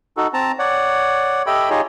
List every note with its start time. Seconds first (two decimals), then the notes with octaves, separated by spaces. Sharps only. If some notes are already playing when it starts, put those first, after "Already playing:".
0.17 D#4 F#4 A4
0.34 C4 A5 A#5
0.59 C#5 D5 F#5
1.46 G4 A4 D#5 E5 G5 B5
1.70 D#4 F4 G4 G#4 C#5 D#5